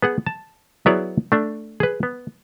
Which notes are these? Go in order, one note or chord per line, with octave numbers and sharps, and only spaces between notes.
B3 G#4 F#5
A5
F#3 B3 E4 G#4 C#5 D5
A3 D4
G#4 B4
B3